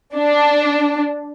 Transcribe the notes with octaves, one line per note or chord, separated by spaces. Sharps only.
D4